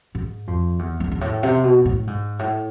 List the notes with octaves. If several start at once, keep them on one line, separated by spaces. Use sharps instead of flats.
G#2
F2
E2
E2
G#2
A2
C3
B2
A2
G#2
A2